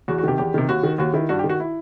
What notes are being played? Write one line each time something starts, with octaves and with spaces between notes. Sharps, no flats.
E2 F#4
F#4
C3 D#3 G4
E2 G4
C3 D#3
D#2 F#4
D#3
D#2 F#4
D#3 E4
G2 F#4
G4
D#3
F#4
E4